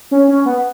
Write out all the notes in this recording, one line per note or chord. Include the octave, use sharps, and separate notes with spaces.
C#4
C#4
B3